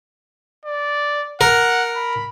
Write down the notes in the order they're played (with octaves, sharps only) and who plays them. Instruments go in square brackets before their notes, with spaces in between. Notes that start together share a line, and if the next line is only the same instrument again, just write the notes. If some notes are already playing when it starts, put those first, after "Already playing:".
[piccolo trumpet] D5
[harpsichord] A#4 [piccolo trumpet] F#5
[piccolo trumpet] B5